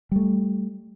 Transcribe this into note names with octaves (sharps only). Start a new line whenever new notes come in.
G3 A3